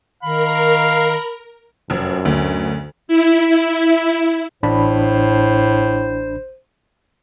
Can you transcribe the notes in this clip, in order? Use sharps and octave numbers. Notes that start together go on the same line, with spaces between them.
D#3 A#4 F5 B5
F1 F#2
D2
E4
A1 A2 D4 C5 B5